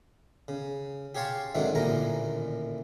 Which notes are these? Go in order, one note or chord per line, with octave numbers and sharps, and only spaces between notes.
C#3
G4 G#4 C#5 F5 A5 C6
G#2 C3 D#3 F#3 A3 D4
A1 D#2 A#2 D3 E3 A#5